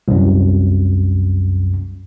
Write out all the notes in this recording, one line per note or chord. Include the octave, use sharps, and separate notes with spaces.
C2 F#2